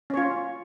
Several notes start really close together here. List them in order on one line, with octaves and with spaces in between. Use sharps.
C#4 C#5 F4